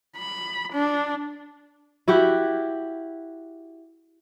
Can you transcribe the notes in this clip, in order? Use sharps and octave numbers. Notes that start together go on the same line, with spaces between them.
B5
D4
E4 F#4 G4 F#5